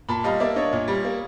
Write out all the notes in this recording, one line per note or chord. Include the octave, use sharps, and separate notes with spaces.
A#2 A5 B5
G3 D#5 F5
A#3 D5 E5
D4 C#5 D#5
A#2
G3
A#3